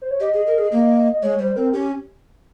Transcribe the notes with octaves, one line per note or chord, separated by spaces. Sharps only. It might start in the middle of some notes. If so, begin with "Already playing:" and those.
C5
C#5
G4 D#5
G#4
A#4
G#4
A#3
D#5
G#3 C#5
G3 C5
C4 A#4
C#4 G4